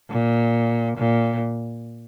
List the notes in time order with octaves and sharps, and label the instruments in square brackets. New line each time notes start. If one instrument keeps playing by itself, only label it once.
[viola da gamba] A#2
A#2